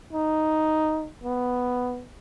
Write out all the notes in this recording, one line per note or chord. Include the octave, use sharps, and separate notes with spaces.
D#4
B3